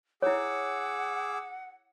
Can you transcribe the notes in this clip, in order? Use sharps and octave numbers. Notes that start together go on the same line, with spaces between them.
E4 G#4 C#5 F#5 D6 E6